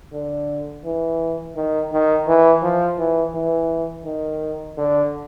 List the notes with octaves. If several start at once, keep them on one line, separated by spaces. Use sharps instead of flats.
D3
E3
D#3
D#3
E3
F3
E3
E3
D#3
D3